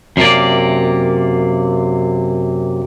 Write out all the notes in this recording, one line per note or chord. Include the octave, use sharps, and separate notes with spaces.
F#2 C3 A#3 D5